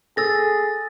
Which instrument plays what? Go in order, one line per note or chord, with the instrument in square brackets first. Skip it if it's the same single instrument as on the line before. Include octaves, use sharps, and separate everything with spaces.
[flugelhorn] G#4 [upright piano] A4 [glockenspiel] E6 A6 A#6